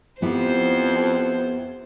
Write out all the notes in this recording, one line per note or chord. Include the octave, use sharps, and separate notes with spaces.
F2 B3 E4 G4 C5